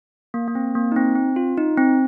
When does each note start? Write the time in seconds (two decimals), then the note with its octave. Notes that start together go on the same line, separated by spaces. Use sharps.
0.34 A#3
0.48 A#3
0.55 C4
0.75 A#3
0.92 D#4
0.96 C4
1.15 C4
1.36 F4
1.57 D#4
1.78 C4